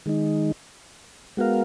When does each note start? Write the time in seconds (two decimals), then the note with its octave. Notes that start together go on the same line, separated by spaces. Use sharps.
0.06 D#3 G#3 D#4
1.37 G#3 B3 F#4 A#4 F5